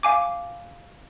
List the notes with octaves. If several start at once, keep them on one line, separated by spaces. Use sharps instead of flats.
F5 G#5 D6